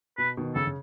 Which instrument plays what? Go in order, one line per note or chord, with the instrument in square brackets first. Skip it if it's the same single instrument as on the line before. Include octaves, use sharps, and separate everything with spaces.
[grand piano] B2 [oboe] B4
[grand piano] B2 D#3
[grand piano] C#3 [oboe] A4
[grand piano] C#3